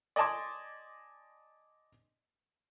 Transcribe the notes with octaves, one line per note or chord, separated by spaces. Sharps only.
D5 D#5 G#5 A5 C6 D6